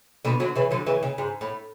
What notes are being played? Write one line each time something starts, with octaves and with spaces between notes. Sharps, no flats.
B2 D3
D3 F#3
C#3 E3
D3 F#3
C#3 E3
C#3
G#2
A2